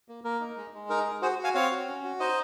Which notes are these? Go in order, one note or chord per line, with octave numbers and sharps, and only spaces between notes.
A#3
A#3 A#4
D#4
G#3
G#3
D#4 A#4
G#4
F#4 G#4 C5
F#4
F5 G#5
C4 C#5 F5
F#4
C#4
F#4
D#4 C5 D#5